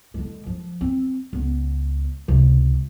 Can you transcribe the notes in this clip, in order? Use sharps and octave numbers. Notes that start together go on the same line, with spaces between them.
D3 G#3
F3
C4
C#2 B3
C#2 C3